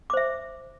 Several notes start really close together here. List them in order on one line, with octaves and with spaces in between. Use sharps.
D6 C5 E5